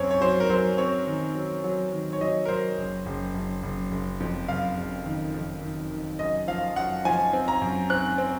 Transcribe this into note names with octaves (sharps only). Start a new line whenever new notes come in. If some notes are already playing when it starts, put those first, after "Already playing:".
Already playing: F#2 C4 C#5
C#5
F#3 C5
A#4
F#3 C5
C4 C#5
D#3
F#3
F#3
D#3
C#5
F#3 D#5
A#4
F#3 C5
F#1
F#1
F#1
F#1
F#1
F2
F#1 F5
F#1
D#3
F2
D#3
D#3
F#2 D#5
F3 F5
F#2 F#5
F3 G#5
C4
A#5
F#2
C4 F#6
C4